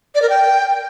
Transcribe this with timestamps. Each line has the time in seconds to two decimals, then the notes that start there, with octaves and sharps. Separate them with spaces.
0.15 D5
0.22 A#4
0.29 G5